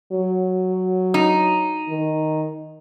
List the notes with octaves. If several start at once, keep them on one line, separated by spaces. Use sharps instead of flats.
F#3
D#4
D#3